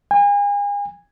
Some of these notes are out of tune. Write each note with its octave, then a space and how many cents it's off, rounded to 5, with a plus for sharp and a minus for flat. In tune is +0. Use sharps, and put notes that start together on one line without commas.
G#5 -35